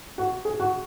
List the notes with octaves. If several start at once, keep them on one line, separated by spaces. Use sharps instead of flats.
F#4
G#4
F#4